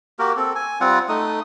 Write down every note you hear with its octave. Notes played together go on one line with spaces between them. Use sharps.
A#3 F#4 G4 A#4
C4 A4
G#5
G3 C4 F4 F#5
A3 D#4 D#6